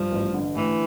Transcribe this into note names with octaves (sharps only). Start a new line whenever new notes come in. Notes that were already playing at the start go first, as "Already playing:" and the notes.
Already playing: G2 F3
A1
D3
A2 E3